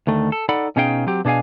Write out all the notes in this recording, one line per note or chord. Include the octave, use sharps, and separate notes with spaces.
D2 D#3 A3
A4
D#4 A4 D5 F#5 B5
B2 C#4 D#4 G#4 F5 G5
F#3 C4 G4
B2 D4 G#4 F5 G#5